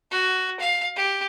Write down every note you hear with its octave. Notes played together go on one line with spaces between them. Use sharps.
F#4
F5
G4